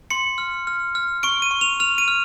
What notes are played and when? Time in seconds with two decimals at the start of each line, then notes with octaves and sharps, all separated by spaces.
0.10 C6 C#7
0.38 F6
0.67 F6
0.95 F6
1.23 C#6 D7
1.42 D#7
1.51 C#6
1.61 F7
1.80 F6 F7
1.98 D#7
2.08 F6